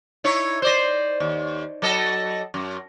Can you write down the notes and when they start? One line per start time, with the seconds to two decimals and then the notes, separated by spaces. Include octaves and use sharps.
0.24 D#4 E4 C#5
0.62 C5 D5 D#5
1.20 D#2
1.82 F#3 A4 D#5
2.54 F#2